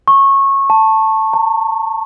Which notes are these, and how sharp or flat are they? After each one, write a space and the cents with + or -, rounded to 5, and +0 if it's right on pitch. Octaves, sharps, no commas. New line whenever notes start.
C#6 -20
A5 +5
A#5 -45